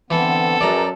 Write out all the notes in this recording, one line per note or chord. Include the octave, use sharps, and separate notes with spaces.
D3 E3 B3 C4 A4
F#2 G#4 A#4 B4 D5 A#5